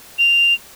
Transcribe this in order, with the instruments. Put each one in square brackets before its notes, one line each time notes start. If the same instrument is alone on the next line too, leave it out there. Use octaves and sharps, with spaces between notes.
[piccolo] F7